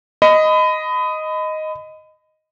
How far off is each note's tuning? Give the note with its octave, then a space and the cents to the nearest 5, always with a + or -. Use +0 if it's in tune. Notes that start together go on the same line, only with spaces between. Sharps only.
D#5 +0 B5 +30